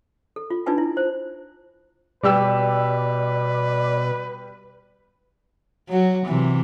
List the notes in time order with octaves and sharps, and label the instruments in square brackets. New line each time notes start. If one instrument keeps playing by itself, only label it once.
[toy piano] A4
F4
D4 D#4 F4 B4 G#5 A5
E4
C5
[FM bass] B2 [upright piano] G3 G4 E6 [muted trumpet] B4 [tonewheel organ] D5
[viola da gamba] F#3 F#4
C3 E3